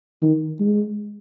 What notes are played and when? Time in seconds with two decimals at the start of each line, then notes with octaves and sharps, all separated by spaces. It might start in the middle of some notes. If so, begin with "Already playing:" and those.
0.22 D#3
0.60 G#3